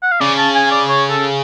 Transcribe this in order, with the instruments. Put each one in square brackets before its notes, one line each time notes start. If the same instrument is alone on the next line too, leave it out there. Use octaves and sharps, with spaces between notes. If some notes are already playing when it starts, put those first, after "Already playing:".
[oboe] F#5
F5
[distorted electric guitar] C#3 [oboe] D5
[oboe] A5
G#5
D5
C#5
A4